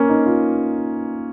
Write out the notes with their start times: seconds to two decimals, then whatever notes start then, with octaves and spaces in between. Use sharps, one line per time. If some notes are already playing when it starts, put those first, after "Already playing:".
Already playing: A#3 C#4
0.09 D#4
0.26 F4